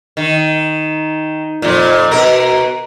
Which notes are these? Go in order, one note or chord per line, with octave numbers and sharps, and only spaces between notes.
D#3
F2 A#2
B2 A#4